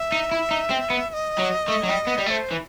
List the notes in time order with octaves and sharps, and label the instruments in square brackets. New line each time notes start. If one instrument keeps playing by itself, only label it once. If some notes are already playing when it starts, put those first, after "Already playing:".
Already playing: [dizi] E5
[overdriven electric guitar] D#4
E4
D#4
C4
B3
[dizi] E5
D#5
[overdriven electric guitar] F#3
A3
F#3
G3
B3
G3
[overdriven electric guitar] A3 [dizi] D#5
[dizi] C5
[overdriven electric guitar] E3